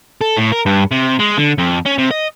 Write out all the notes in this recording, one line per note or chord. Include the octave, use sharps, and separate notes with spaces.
A4
A2
A#4
G2
C3
G#3
D3
F2
C#4
C3
D#5